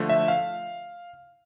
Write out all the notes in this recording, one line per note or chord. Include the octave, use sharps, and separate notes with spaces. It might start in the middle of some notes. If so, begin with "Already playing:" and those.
Already playing: D3 F3 A3
E5
F5